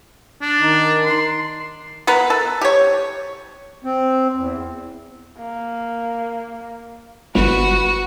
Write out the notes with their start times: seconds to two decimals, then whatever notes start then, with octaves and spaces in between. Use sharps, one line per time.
0.42 D4
0.60 D#3 D#4
1.05 C6
2.07 B3 A#4 B4
2.30 A4
2.61 G4 C#5
3.84 C4
4.37 E2
5.39 A#3
7.35 G1 F#4 B4